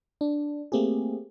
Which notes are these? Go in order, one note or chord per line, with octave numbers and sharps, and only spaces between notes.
D4
A3 A#3 C4 G4 G#4